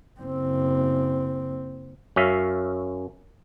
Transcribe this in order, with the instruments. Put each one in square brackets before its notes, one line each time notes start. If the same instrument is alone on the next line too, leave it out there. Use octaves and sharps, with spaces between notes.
[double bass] F#1 C4
[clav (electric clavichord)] F#2 C#4 E5 F5